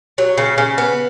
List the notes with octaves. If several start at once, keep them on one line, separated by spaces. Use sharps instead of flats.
F#3
C#3
C#3
B3